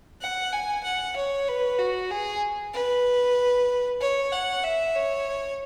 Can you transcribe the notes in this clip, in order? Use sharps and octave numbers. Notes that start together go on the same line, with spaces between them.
F#5
G#5
F#5
C#5
B4
F#4
G#4
B4
C#5
F#5
E5
C#5